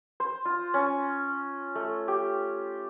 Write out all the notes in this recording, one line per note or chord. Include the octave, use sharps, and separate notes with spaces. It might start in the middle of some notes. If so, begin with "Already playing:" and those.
C5
F4
C#4
A3
G4